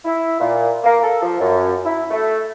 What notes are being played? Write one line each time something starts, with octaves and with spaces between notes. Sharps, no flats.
E4
A#2
A#3
A4
F3
F#2
E4
A3